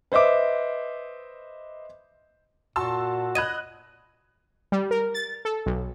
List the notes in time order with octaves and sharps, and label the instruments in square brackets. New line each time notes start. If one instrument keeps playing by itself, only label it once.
[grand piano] B4 C5 D#5 E5 D6
[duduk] A#2 [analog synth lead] F#4 [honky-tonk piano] A5 C6 E6
[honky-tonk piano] D#5 F#6 [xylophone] B5 G#6 D#7
[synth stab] G3
A#4
A6
A4
B1